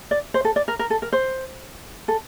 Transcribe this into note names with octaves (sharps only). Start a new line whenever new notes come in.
D5
C5
A4
D5
A#4
A#4
A4
A#4
C5
A4